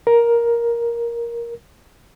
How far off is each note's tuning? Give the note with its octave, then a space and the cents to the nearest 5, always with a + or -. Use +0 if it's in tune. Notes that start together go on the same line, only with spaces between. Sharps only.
A#4 +10